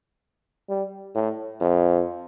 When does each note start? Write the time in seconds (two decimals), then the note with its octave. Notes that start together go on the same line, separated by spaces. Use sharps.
0.69 G3
1.15 A2
1.61 F2